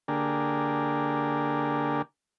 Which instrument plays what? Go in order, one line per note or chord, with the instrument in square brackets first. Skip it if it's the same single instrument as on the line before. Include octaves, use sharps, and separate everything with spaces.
[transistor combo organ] D3 A#3 D4 G4 G#4 A#4